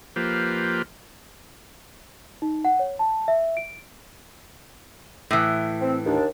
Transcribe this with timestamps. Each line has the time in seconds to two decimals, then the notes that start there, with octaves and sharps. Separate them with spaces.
0.16 F3 A#3 F4 G4 B4 C5
2.42 D#4
2.65 F#5
2.79 C#5
2.99 A5
3.28 E5
3.57 D7
5.31 A2 E3
5.81 C4
6.05 D#2 D4